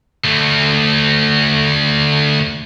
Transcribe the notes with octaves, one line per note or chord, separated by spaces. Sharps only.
D2 A3